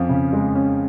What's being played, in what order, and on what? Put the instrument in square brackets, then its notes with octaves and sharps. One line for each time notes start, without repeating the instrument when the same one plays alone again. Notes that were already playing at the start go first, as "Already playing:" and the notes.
Already playing: [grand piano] F2 C#4 [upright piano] F3 F4
[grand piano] C#3
G#3
C#4